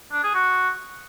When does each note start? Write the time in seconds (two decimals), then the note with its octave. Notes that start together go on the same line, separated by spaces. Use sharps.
0.12 D4
0.23 G#4
0.34 F#4